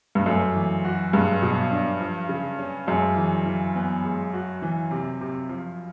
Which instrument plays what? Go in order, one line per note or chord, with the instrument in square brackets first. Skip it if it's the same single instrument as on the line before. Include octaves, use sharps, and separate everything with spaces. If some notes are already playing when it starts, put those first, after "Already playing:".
[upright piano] G2
[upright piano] F#2 [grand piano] A3
[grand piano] E3
F#4
[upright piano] G2 [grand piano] G#3
[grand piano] B2
D4
F3
C#3
C#4
[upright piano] F#2 [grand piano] G#3
[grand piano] E3
E3
B3
G#3
F#4
E3
C3
C3
F3